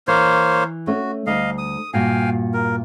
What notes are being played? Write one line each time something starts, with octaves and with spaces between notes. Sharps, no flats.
E3 A#3 C5 C#5
A3 C#4 F#4
D2 G3 D#5 F5
D#6
G2 A#2 F#4 F5 G5 G#5
A#4